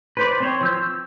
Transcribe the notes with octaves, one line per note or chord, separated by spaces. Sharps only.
B4 C5 D5
C4 C5 C#5
F3 E6 G6
E6